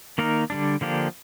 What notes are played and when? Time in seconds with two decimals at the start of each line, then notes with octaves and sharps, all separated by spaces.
0.18 D#3 A#3 D#4 A#4
0.50 D3 G3 D4
0.81 D3 F3 A#3 D4 G4